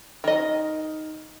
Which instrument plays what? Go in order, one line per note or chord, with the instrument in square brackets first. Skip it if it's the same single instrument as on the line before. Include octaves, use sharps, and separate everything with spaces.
[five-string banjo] D#3 D#5